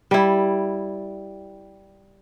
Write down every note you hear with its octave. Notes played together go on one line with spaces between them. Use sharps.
G3 E4